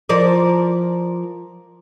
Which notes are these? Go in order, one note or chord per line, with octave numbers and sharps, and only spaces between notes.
F3 A#4 D5